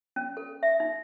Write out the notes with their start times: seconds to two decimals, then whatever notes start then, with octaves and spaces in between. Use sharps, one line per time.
0.16 C#4
0.37 A4
0.63 E5
0.80 D#4